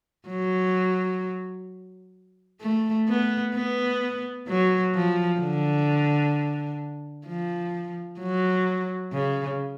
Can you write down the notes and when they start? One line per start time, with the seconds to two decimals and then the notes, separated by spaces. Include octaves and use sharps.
0.28 F#3
2.61 A3
3.08 B3
3.54 B3
4.48 F#3
4.94 F3
5.41 D3
7.27 F3
8.20 F#3
9.13 C#3